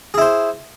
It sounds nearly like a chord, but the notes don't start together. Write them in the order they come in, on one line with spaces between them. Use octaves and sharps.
G#4 E4 C5